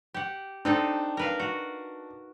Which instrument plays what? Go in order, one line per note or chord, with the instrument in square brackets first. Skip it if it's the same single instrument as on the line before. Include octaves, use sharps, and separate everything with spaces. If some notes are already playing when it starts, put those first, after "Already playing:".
[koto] G4 F#5
[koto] C4 D#4 A4 [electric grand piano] D4
[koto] A#4 B4 F5
F#4